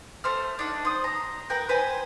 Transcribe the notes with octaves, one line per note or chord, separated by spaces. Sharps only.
A3 C5 F6
D4 D#4 F#5
C5 D#6
A#5
A#4 B4 F#5 G5
B4 C5 G#5